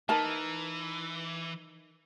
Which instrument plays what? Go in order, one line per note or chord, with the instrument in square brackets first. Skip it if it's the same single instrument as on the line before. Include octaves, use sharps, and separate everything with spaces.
[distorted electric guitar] E3 [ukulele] D#4 A#4 A5